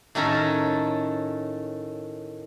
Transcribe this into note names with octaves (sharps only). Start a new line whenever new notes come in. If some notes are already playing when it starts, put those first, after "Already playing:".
A2 D#3 C#4 A4 A#5